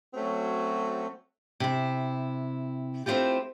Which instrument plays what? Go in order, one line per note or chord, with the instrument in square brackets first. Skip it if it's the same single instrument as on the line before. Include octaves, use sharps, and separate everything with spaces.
[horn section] F#3 A3 C4 C#4 F#4 C#5
[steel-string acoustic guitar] C3 E4
A3 C4 D4 E4 F4 G4